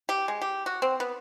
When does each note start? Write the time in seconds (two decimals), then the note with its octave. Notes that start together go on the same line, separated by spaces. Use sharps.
0.09 G4
0.28 G#3
0.42 G4
0.66 F#4
0.82 C4
1.00 B3